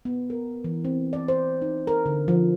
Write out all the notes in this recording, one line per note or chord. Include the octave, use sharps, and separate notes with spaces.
B3
A#4
E3
C4
D5
C5
D#4
A#4
D3
F3